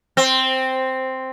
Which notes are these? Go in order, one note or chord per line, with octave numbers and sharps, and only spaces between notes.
C4